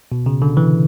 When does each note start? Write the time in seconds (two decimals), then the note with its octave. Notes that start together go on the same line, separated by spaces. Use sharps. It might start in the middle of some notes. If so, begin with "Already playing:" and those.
0.12 B2
0.26 C#3
0.42 D3
0.57 E3